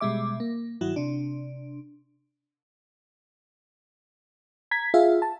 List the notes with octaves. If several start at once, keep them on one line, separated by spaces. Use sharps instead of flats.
B2 G3 G#3 E5 D6
A#3
G2 D#3 F#3 E4 F#4
C3 D4
A#5 G#6 B6
F4 G#4 E5 F5
A5